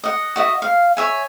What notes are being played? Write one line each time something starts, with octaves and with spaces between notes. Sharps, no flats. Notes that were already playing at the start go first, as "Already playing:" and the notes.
D#5 F#5
F#4 D#5 E5
F5
C#5 E5 G#5